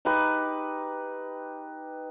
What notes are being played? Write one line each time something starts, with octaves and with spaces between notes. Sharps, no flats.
D#4 G4 B4